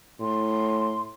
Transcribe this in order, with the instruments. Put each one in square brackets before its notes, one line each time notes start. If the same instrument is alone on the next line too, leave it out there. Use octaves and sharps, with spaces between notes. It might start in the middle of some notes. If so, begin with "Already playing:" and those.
[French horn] A2 [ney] C6